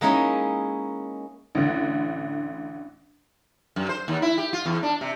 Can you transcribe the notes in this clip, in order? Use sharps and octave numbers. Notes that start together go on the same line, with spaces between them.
G#3 A#3 C#4 D#4 E4 C#5
A1 D2 D3
F#2
C5
D#2
E4
G4
F4
E2
D4
C3